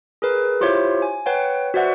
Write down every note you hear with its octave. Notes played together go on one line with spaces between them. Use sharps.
G#4 A#4 B4
E4 F4 G4 C5 C#5 E5
G#5
B4 C#5 F#5 G5
F#4 B4 C5 D5 E5 F#5